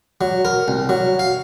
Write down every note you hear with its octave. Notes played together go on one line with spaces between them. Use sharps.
F#3
A#4
C2
F#3
F5